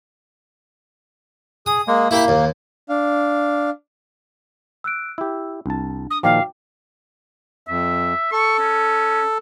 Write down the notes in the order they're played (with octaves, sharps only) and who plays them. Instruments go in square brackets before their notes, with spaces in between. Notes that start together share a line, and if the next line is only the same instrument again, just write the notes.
[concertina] G#4 [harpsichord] D#6
[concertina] G#3 A#3
[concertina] A#3 [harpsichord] E4 G4 B5
[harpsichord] D#2
[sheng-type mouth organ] D4 F5
[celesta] E6 F#6 D7
[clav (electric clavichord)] E4 G4 [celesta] E6
[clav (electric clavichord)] C2 A5 [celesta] D4
[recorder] D#6
[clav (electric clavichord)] A#2 D#3 F3 [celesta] F#4 G5 D6 [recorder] F5
[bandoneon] F2 [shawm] E5
[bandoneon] A4 [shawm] C#6
[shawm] C#4